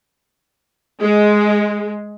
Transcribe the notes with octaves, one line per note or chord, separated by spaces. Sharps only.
G#3